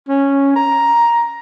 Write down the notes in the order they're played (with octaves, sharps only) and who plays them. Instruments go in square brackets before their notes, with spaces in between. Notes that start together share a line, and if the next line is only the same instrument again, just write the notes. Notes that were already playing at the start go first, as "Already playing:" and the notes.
[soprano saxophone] C#4
A#5